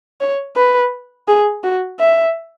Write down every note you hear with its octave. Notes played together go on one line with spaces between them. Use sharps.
C#5
B4
G#4
F#4
E5